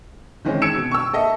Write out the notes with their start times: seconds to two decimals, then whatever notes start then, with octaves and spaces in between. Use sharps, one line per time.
0.45 D#3 E3 G#3 C4 C#4
0.62 E6 G#6 C#7 D7 E7
0.76 B2
0.91 C#6 E6
1.13 A#3 A4 D#5 E5